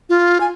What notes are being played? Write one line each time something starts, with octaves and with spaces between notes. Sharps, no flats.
F4
G#5